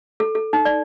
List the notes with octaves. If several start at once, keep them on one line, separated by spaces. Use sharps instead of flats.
A4
A4
D#4
D5